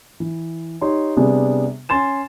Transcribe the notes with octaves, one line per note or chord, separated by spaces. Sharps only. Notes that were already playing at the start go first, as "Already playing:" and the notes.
E3
D#4 G4 C#5 C6
C3 G3 B3 C4 D4 G#4
C#4 G#5 C6 A6 E7